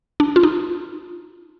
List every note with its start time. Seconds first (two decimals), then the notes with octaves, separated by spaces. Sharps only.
0.20 D4
0.36 F4
0.43 D#4